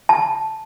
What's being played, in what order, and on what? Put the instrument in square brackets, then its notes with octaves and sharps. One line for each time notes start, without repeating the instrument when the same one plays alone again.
[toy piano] A5